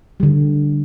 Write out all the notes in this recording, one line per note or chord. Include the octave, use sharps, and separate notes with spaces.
D3 G3